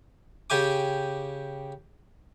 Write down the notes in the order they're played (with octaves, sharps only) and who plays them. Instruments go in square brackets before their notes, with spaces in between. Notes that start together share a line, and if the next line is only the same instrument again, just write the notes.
[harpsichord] C#3 G4 G5 G#5 D6